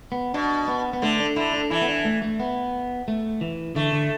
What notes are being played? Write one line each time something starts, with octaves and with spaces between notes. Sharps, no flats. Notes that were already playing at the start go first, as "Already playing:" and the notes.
B3
B2 D4
B3
B3
D3 A3
D4
D3 E4
D4
E3 E4
B3
D4
A3
A3
B3
A3
E3
D3 A3
D3